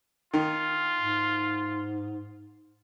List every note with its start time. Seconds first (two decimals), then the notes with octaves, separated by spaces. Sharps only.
0.34 D#3 F4
1.00 G#2